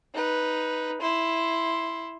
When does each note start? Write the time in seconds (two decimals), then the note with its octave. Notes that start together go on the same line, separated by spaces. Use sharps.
0.14 D#4 B4
1.01 E4 C6